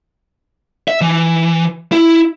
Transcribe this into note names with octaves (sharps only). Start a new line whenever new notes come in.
E5
E3
E4